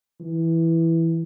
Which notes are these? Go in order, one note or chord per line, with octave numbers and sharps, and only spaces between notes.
E3